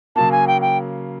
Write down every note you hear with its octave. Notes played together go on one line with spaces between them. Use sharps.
C#3 F#3 A#3 A5
G#5
G5
G5